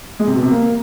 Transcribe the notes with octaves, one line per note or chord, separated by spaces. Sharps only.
G#3
C3
B2
C3
A#3